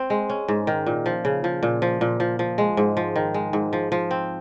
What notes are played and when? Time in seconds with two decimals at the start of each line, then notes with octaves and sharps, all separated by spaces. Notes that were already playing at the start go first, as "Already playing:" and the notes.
Already playing: C4
0.10 G#3
0.30 C#4
0.48 G#2
0.67 D#3
0.86 A#2
1.06 F3
1.25 C#3
1.44 F3
1.63 A#2
1.82 F3
2.01 A#2
2.20 F3
2.39 F3
2.58 G#3
2.77 G#2
2.97 F3
3.16 D#3
3.34 G#3
3.53 G#2
3.73 F3
3.92 F3
4.11 C4